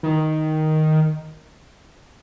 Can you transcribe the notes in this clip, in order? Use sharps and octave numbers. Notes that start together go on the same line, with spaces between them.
D#3